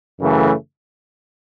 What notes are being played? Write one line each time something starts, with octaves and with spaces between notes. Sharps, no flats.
F#2 C#3 E3 A3